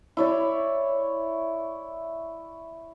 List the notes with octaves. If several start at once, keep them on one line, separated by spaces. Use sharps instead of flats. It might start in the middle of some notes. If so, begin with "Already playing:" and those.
E4 C#5 D5